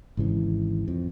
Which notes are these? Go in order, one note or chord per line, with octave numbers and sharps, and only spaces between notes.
G#1 G#2 C#3 E3
F2